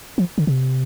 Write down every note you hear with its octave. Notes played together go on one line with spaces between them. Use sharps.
F3
D3
C3